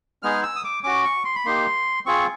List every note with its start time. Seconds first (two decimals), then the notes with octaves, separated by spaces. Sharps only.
0.23 G#3 B3 D#4 G#4 F6
0.43 E6
0.56 D#6
0.64 D6
0.84 C#4 F#4 D6
1.05 C#6
1.25 C6
1.35 B5
1.45 A#3 D#4 G4 C6
2.05 C4 F4 G#4 C#6